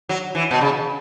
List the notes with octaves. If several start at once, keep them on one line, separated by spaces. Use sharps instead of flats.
F#3
E3
B2
C#3